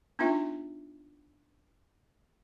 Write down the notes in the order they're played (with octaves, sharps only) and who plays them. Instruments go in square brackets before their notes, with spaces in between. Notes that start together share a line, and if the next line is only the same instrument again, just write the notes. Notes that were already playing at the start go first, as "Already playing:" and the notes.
[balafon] B3 D4 D#4 F4 E5